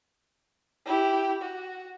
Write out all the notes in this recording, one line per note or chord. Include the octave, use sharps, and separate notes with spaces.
E4 G4
F#4